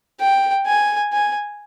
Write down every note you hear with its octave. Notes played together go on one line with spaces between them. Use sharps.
G5
G#5
G#5